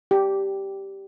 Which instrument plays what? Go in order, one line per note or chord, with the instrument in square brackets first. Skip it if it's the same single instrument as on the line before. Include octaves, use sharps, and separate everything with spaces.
[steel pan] G4